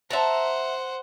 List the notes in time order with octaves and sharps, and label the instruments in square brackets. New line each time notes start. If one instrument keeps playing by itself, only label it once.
[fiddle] C5 F#5 [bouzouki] E5 A5 A#5